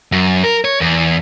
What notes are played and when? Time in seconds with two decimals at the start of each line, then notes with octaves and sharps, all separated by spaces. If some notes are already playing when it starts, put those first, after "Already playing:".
0.12 F#2
0.44 A#4
0.65 C#5
0.81 E2